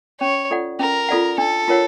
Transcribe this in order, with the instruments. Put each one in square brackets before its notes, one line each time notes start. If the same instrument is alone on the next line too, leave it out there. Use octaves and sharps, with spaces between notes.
[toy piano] C#4 [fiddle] C#5
[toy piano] F4 A4 D5 F#5
[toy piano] C#4 [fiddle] A#4
[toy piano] F4 A4 D5 F#5
[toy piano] D4 [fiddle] A4
[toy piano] F4 A#4 C#5 F#5